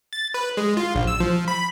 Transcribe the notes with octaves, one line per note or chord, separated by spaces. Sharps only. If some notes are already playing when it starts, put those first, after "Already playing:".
A6
B4
G#3
F4
A#1
E6
F3
B5